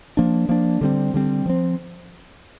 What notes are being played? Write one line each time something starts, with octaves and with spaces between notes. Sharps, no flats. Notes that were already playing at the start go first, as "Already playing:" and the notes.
F3 A#3 D4
F3 A#3 D4
D3 G3 C4
D3 G3 C4
F3 C4